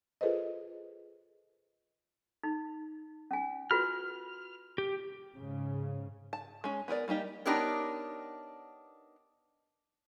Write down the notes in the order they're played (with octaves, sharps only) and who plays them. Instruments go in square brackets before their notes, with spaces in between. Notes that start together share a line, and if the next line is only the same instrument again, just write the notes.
[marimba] F4 G#4 A4 B4 C5 D#5
[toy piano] D#4
C#4 G#5
[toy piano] F4 F#4 B4 [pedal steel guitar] F6
[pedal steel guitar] G4
[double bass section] G#2 C#3
[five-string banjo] A5
G#3 C#4
B3 G#4 A#4 D5
G3 A#3 D#4 G4
[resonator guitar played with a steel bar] B3 D4 D#4 G4 A#4 C#5